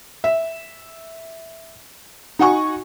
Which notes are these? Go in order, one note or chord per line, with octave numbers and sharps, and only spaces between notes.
E5
D#4 F#4 F#5 G#5 C#6